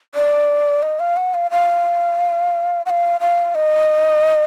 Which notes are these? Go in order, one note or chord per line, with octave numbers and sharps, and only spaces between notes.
D5
D#5
F5
F#5
F5
F5
F#5
F5
F5
D#5